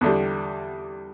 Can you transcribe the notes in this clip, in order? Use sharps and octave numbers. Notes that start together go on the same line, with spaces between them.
E2 D3 G3